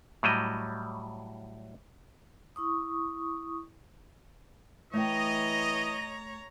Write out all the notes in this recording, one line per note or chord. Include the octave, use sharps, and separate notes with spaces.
A2 F#3 G3 D#5
E4 C#6 D#6
E3 A3 C#5 D#5 G5 A#5